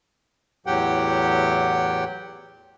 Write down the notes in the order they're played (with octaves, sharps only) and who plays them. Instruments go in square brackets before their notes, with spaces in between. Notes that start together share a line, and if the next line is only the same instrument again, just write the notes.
[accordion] E2 A2 F#3 G4 F#5 G5